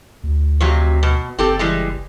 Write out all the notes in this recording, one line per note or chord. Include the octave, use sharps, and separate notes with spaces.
D2
F2 C3 F#3
B2
F#1 C4 G4 A4
E3 G3 G#3